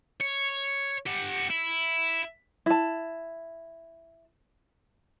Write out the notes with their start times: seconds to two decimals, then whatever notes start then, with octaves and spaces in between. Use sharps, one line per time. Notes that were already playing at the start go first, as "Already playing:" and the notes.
0.20 C#5
1.06 G4 F#5
1.50 E4
2.66 E4 A5